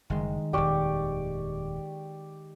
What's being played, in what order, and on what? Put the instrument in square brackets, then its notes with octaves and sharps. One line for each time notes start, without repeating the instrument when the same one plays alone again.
[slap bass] F#1 [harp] D#3 G#3
[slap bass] D#1 F2 [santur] G4 D5 C#6